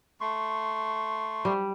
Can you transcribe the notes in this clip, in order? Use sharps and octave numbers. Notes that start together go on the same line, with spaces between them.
A3 C6 C#6
G3